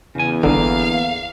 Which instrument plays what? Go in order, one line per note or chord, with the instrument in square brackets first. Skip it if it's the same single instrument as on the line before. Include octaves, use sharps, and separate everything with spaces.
[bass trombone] E2 [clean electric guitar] C#3 G#5
[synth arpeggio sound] G1 D3 [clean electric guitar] A#3 [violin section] F5